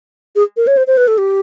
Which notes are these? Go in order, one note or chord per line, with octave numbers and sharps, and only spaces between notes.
G#4
A#4
C#5
C5
C5
B4
A4
G4